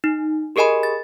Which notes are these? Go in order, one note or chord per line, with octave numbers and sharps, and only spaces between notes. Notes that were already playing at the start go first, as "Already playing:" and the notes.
D#4
G4 G#4 A#4 D#5 G#5 B5
A6